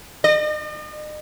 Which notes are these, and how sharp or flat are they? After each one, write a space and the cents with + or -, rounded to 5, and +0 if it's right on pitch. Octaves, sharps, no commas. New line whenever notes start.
D#5 -45